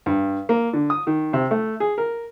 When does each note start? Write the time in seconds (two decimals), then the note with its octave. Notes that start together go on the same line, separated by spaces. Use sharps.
0.06 G2
0.49 A#3
0.73 D3
0.90 D#6
1.07 D#3
1.33 C3
1.51 A3
1.80 G#4
1.98 A#4